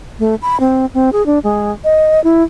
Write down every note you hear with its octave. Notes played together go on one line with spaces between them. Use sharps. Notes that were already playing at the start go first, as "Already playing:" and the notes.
A3
B5
C4
C4
G#4
D4
G#3
D#5
E4